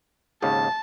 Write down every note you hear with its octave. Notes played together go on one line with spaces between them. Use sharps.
G#1 D#2 C#3 A5